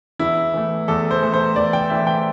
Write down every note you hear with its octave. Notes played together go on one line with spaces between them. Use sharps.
E2 E4
E3 A3
E2 A4
C5
E3 A3
C5
E2 D5
G5
E3 A3 E5
G5